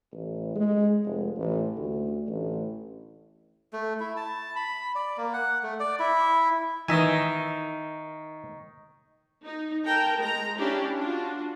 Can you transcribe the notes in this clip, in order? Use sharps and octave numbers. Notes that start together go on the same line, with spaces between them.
A1
G#3
F1
A1
D2
A1
A3
E4
A5
B5
D5
A#3
F#5
A3
D5
E4
D#3 E3 D#4 D#5 E5 G#5 A#5 C#6
D#4
A#4 G5 A5 A#5
G#3 A#5
C#4 D4 E4 G4
D4 F4 F#4